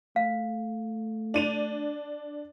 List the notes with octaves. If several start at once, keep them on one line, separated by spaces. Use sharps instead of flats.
A3 F5
D4 D#7 F7